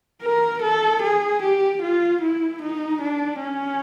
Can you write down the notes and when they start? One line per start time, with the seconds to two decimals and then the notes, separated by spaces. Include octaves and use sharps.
0.22 A#4
0.62 A4
1.02 G#4
1.42 G4
1.82 F4
2.22 E4
2.62 D#4
3.01 D4
3.42 C#4